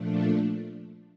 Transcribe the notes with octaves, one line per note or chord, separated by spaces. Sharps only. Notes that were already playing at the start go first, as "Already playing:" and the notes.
Already playing: A#2 F3 A3 D4